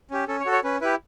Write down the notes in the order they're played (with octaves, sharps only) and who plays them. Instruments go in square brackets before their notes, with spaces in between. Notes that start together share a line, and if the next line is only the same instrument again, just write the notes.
[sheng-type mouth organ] C#4 G4
C#4 A4
C#5
F#4 A4
C#5
C#4 B4
E4 G4 B4